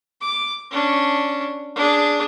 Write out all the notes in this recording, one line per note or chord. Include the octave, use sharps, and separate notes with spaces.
D6
C#4 D4
D4 G#4